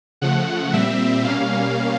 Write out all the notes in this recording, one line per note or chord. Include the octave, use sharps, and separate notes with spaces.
C#3 F3 A3 F#5
A#2 G3 C4 E5
B2 G3 A#3 C#4 F5